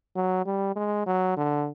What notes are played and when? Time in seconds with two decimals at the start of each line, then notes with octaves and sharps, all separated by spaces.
0.16 F#3
0.46 G3
0.76 G#3
1.06 F#3
1.37 D3